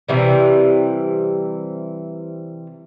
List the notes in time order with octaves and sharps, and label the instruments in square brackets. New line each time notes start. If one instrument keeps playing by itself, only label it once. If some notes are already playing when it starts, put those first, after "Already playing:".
[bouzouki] C3 E3 G3